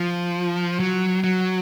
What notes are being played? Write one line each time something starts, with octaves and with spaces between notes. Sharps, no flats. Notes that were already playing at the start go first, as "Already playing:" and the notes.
Already playing: F3
F#3
F#3